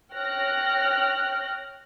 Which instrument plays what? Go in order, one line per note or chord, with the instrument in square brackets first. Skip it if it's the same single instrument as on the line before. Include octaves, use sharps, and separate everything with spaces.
[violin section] C#5 G5 F6 F#6 A#6